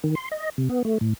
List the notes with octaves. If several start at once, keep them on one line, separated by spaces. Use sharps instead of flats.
D#3
C6
D#5
C3
B3
A3
A2